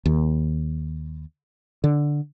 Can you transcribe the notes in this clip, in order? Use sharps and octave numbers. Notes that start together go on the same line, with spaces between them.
D#2
D3